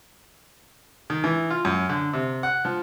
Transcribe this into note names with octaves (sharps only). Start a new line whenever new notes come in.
D#3
E3
F4
F#2
D3
C3
F#5
F3